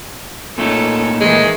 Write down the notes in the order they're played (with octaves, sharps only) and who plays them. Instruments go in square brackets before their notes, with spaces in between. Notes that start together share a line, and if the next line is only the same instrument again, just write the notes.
[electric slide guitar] A#2 A3 D#4 [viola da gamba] C#4 A4
[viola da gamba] D#3 E3 [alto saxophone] G#3